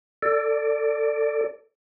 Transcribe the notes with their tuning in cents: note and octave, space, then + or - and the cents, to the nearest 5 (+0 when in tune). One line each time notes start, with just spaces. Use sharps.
A4 +20 D5 +0